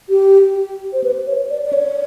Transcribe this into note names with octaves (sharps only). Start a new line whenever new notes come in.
G4
C5
B4
C#5
D5
D5
C#5